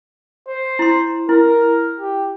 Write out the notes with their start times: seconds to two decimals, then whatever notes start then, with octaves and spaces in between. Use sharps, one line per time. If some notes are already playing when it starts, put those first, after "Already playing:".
0.48 C5
0.79 E4 C6
1.29 E4 A#4
2.00 G4